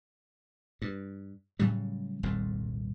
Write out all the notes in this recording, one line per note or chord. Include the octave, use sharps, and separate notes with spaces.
G2
A2 C#3 F#3 G3
D#1 C2 F2 G#2